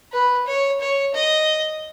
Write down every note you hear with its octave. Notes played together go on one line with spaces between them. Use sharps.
B4
C#5
C#5
D#5